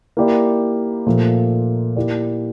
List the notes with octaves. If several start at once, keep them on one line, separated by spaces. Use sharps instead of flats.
A#3 E4 G4 D5
A#2 F3 A3
A#3 E4 G4 D5